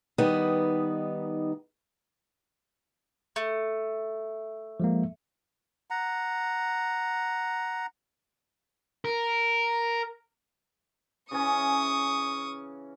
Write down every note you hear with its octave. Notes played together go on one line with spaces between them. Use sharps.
D#3 G3 B3 D#4
A3
F3 G#3 A#3
F#5 A#5
A#4
C#3 E3 C#4 C#6 D#6